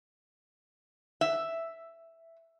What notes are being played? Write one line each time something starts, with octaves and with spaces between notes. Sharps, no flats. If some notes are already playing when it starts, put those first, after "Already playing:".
E5